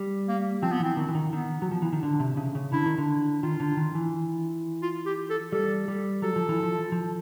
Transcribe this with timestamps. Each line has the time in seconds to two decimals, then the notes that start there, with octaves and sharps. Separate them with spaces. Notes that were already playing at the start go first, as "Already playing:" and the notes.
Already playing: G3
0.28 A#3
0.63 F3 C4
0.72 B3
0.80 E3 C4
0.97 D#3
1.08 E3
1.15 D#3
1.32 D#3 B3
1.62 F#3
1.72 F3
1.82 E3
1.93 D#3
2.03 D3
2.20 C3
2.37 C#3
2.55 C#3
2.72 D3 E4
2.86 D#3
2.98 D3
3.43 D#3 F4
3.60 D3
3.77 D#3
3.95 E3
4.82 F4
5.06 G4
5.30 A4
5.52 G3 A4
5.88 G3
6.22 F#3 A4
6.36 F3
6.49 E3
6.63 F3
6.92 F3